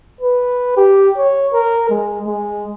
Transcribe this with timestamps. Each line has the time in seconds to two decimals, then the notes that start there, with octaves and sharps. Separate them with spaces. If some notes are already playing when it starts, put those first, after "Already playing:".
0.21 B4
0.77 G4
1.18 C#5
1.53 A#4
1.90 G#3
2.27 G#3